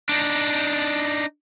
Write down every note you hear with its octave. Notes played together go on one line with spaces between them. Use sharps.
D4 D#4